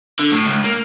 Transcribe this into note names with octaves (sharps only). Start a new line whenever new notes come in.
D3
A2
C#2
A#3